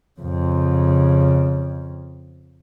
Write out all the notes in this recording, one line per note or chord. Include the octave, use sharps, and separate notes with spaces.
F2 C#3